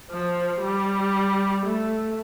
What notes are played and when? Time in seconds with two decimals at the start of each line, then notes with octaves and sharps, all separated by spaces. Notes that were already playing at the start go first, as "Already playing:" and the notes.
0.11 F3
0.62 G3
1.66 A3